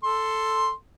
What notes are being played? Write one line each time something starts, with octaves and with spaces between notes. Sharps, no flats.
A4 C6